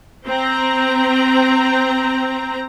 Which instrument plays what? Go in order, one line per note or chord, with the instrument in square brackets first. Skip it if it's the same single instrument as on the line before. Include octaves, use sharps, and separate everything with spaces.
[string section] C4 A#5